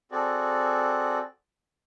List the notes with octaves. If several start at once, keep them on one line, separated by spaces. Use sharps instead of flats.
C4 F#4 G#4 A4 D5